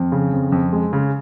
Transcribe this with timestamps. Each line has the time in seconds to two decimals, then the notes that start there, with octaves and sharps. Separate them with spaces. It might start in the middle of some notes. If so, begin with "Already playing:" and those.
Already playing: F2
0.12 C#3
0.33 F2
0.52 F2
0.72 G#3
0.93 C#3